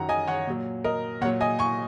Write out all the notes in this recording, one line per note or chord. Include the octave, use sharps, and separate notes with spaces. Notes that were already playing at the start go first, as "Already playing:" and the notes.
Already playing: F#2 D#3 F#3 F#5 A#5
D#5 G#5
C#5 F#5
A#2 F#3
A#4 D#5
A#2 F#3 C#5 F#5
D#5 G#5
G#5 C#6